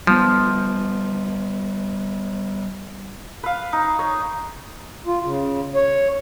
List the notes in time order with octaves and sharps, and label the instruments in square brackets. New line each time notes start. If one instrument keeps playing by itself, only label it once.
[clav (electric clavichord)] F3 [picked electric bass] G3 B3
[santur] B4 F5
D#4
C#5 D#5
[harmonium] F4
C#3
C#5